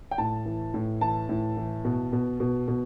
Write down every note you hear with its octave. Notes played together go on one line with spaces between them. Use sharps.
G5
A2 A5
E3
A2
E3 A5
A2
E3
B2
B2
B2
B2